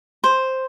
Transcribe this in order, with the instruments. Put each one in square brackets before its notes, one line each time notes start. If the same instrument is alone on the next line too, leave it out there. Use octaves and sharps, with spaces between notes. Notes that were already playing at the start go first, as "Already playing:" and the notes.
[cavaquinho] C5